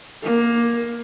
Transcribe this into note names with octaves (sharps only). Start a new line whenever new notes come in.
A#3